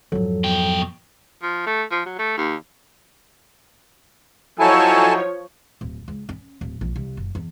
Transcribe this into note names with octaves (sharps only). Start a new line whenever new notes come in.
F2 G#2 F3 F#3 A4
B2 G5
F3
A3
F3
F#3
A3
D#2
F3 F#3 D#4 E4 A4 C#5 G#5 A5
D1
C#2
C#4
D1
A#1
C2
F#1
E2